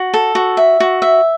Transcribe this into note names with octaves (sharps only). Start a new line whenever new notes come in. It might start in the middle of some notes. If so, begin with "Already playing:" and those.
Already playing: F#4
A4
F#4
E5
F#4
E5